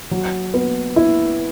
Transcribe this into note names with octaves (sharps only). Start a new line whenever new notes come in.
F#3
B3
E4